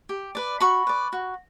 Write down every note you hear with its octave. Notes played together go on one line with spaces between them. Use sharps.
G4
B4 D5
F#4 B5 C#6
B4 D5
F#4